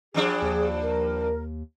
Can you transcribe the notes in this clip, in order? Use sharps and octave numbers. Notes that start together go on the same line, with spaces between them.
G2 F3 D4 G#4
D#2
A#4